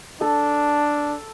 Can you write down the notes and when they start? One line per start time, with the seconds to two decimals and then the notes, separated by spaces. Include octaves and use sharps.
0.21 D4 A4